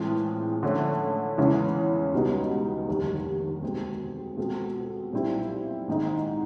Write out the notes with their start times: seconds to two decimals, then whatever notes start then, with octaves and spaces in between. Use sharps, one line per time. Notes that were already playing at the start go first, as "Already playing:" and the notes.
Already playing: A2 E3 G#3 C4 F4
0.63 D3 F3 A3 C#4
1.38 E2 C#3 E3 G#3 C#4
2.13 C#2 B2 G3 B3 D#4
2.88 F1 D#2 D3 G3
3.62 B2 G#3 C4
4.37 B2 G#3 C4 F4 A4
5.13 B1 A#2 G3 C4 E4
5.88 G#2 D#3 G#3 C4 D#4